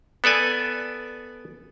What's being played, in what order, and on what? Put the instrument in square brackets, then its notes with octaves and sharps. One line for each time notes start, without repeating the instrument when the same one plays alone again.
[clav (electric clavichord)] B3 A4 D5 G#5